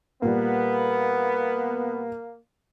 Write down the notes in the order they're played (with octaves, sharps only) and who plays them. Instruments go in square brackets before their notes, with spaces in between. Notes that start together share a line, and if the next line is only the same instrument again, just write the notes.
[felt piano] A#2 G3 [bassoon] A#3 [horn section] B3